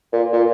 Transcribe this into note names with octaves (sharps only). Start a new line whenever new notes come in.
A#2
A#2